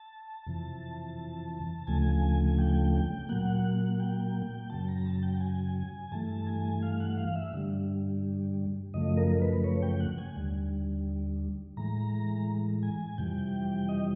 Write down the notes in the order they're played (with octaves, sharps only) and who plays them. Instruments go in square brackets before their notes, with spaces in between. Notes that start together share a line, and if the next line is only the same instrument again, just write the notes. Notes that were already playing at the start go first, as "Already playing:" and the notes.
Already playing: [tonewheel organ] A5
F2 C3 E3
D2 C#3 F3 A3 G#5
G5
A#2 F#3 A#3 F#5
G5
F#2 C#3 F#3 A5
A#5
A5
G5
G#5
G2 E3 A3 A5
G#5
F5
F#5
F5
E5
G2 D3 G3
F#2 C#3 F3 A3 D#5
A#4
B4
C#5
G5
F#5
G#5
D#2 D3 G3
A2 E3 G#3 A#5
G#5
F2 C3 E3 G3 G5
D#5